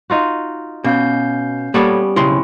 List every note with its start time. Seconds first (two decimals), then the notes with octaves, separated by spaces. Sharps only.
0.10 D#4 F4 F#4
0.84 B2 C#4 F5 G6
1.74 G3 A#3 B3 C#4 A4 C#5
2.16 B1 C#3 C4 C#4 E4 C6